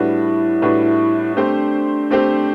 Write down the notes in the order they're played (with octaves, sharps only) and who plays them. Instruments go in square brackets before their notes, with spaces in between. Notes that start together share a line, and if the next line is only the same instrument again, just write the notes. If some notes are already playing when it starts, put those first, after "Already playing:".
Already playing: [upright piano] A2 G3 D4 F#4 B4 [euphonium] E4
[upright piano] A2 G3 D4 F#4 B4
[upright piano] A3 C4 G4 C5 [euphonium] D4
[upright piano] A3 C4 G4 C5